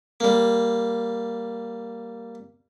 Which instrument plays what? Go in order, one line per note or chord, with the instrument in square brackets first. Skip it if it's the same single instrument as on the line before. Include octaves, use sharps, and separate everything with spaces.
[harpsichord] G3 A#3